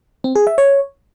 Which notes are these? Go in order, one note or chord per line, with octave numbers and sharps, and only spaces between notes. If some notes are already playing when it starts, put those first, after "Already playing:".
C4
G#4
E5
C#5